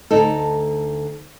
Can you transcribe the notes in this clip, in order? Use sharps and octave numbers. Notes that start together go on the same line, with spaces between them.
D2 D#4 A4